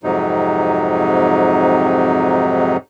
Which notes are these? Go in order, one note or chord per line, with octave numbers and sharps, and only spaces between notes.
F2 G#2 C3 F#3 D#4